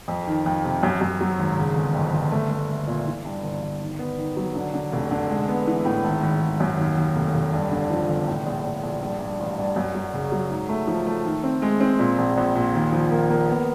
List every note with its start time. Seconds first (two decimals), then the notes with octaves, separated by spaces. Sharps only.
0.08 F2
0.27 D#3
0.46 F2
0.64 C3
0.83 F#2
1.01 F#2
1.21 F#3
1.39 G#1
1.57 C#3
1.76 G1
1.95 F2
2.14 G1
2.31 A3
2.51 A3
2.69 A3
2.87 A#2
3.06 E3
3.25 G2
3.43 G1
3.62 G1
3.81 D#3
3.99 B3
4.18 D#3
4.37 F#3
4.55 D3
4.74 D3
4.92 F1
5.11 D3
5.29 G#3
5.48 B3
5.67 E3
5.85 A2
6.04 G#1
6.23 G#1
6.41 G#1
6.60 F#2
6.78 D#2
6.97 D#2
7.16 F1
7.34 F1
7.53 G2
7.71 D3
7.90 F3
8.08 G1
8.27 A2
8.46 A#1
8.65 A2
8.83 A#1
9.02 G2
9.20 G2
9.39 A1
9.57 G2
9.76 F#2
9.95 F#3
10.13 C#3
10.32 F#3
10.50 G#2
10.69 A3
10.87 F3
11.06 A3
11.25 D#3
11.44 C4
11.62 G#3
11.81 C4
11.99 A#2
12.18 A#1
12.37 A#1
12.55 A#2
12.74 D#2
12.92 F3
13.11 A#3
13.30 A#3
13.48 B3